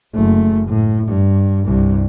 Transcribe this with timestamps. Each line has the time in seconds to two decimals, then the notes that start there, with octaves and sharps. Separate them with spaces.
0.15 F#1 A3
0.68 A2
1.08 G2
1.65 C2 G2